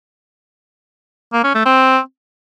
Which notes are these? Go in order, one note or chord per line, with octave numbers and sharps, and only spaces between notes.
A#3
C#4
A3
C4